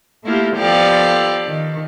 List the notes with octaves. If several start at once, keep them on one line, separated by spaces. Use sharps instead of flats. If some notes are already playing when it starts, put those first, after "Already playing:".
A3 A#3 E4 F4 G4
F3 B3 G4 A4 D5 F5
D#3